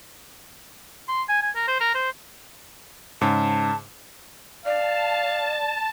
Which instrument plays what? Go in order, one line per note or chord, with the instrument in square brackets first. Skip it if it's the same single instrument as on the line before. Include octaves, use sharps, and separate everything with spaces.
[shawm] C6
G#5
G#5
A#4
C5
A#4
C5
[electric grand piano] G#2 C#3 [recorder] A5
[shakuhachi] D5 [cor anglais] F5 [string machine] A5